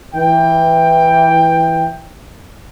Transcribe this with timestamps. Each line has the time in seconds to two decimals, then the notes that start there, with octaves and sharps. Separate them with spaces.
0.15 E3 G5